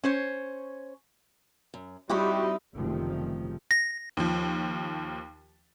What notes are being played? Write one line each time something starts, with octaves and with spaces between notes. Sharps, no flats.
C#4 C5 C#5
F#2
G3 C4 D#4 E4 F#4 G4 D#5 C#6
F#1 C3 D#3 F3 G3 A3
A#6
D#2 F3